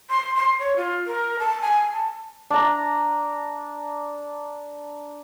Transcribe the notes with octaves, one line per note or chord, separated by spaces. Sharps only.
C6
C6
C#5
F4
A#4
A5
G#5
A5
D4 A#5